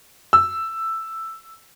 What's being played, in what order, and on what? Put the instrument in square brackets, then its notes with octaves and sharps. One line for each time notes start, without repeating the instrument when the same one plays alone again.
[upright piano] E6